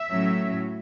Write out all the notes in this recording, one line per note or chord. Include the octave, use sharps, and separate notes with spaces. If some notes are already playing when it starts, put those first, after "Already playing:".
Already playing: E5
A2 F#3 C#4